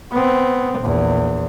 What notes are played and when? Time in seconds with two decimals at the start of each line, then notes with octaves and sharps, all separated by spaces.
0.12 B3 C4
0.80 A#1 E2